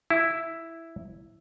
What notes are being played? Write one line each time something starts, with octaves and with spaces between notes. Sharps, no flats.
E4